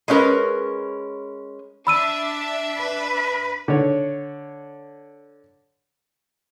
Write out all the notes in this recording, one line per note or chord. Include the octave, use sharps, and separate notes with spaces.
G#3 A3 C#4 D#4 A#4 B4
D4 E5 B5 E6 D#7
B4
D3 C#5